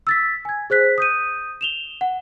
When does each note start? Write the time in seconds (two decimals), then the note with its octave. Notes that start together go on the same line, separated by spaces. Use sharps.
0.07 E6 A6 B6
0.45 G#5 G#6
0.70 G#4 C5 F#6 B6
0.98 D#6 G6 D#7
1.61 E7 F7 G7
2.01 F#5